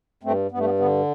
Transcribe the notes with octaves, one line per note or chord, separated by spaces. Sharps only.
G2 A3 C4
G2 B3
A3
B3
D3 B3